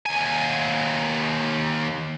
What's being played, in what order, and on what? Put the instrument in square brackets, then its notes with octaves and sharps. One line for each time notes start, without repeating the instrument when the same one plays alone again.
[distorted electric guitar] D#2 G#5